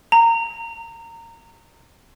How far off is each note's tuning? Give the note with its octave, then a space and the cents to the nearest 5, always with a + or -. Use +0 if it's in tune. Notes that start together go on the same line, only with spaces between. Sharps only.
A#5 -20